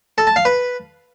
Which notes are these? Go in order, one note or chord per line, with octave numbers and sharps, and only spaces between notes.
A4
A5
F5
B4